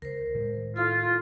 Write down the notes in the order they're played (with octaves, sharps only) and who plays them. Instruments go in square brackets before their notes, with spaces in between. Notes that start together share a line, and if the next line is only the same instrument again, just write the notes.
[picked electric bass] C#2 [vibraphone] A#4 C5
[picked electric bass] A2 D#3 G#3
[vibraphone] E4 A4 [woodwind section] F4